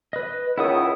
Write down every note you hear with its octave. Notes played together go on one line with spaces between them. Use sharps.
B4 D#5
C#2 D#3 E4 F#5 D#6